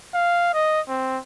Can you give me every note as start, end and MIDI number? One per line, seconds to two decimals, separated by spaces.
0.14 0.50 77
0.54 0.80 75
0.88 1.19 60